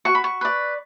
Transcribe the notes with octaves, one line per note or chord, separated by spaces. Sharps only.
F#4 C#6
B5
C#6
B4 D5